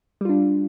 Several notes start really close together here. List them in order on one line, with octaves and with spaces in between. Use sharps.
G3 F4 D4